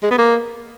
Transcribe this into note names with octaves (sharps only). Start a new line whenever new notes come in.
G#3
B3
A#3